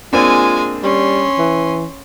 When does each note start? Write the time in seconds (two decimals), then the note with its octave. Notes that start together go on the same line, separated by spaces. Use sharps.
0.13 G#3 A#3 C4 D4 F4 G#5
0.83 G3 C#4 C6
1.39 E3